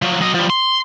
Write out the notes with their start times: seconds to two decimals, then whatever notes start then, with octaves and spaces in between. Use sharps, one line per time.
0.02 F3 F#3
0.21 F#3 D#5
0.34 F3 G3
0.50 C6